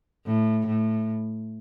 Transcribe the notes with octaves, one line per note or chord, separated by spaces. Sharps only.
A2
A2